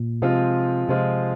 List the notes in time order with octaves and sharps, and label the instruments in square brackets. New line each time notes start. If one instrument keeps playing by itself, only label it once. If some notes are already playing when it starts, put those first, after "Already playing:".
Already playing: [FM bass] A#2
[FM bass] C3 [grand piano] F3 G#3 C4 F4
[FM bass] C3 [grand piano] F3 G#3 C4 F4